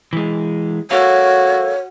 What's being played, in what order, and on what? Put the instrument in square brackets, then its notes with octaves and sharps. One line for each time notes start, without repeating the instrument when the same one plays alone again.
[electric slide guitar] E3 G#3
[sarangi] F#4 [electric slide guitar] A4 A#4 F5 [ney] C#5